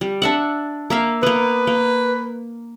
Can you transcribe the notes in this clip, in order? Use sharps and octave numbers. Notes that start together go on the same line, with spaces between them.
G3
D4 E5 F#5
A#3 E5 F5
A#3 B3 B4
A#3